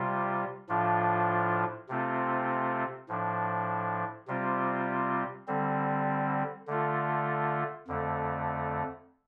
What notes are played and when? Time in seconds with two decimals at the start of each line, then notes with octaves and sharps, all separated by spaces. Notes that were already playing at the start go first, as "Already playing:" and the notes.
Already playing: C3 G3 F4
0.69 A2 F3 D4 F4
1.89 C3 A3 C4 F4
3.09 A2 F3 D4
4.27 C3 G3 C4 F4
5.47 D3 G3 C4
6.67 D3 A3 F4
7.88 F2 D3 A3